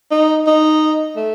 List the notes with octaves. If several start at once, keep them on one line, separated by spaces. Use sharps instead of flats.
D#4
D#4
A3